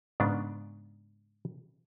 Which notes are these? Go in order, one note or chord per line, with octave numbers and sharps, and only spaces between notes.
G#2 C#3 B3 D4